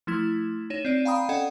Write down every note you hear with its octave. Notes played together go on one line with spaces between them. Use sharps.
F3 A3 E4 G#6
D#4 C#5 E7
C4 D5 D7 D#7
F5 G5 A#5 B5 D#6
C#4 A4 D5 D#5 F#5 G5